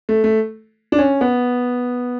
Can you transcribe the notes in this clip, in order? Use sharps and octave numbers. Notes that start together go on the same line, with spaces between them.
A3
A3
D4
C#4
B3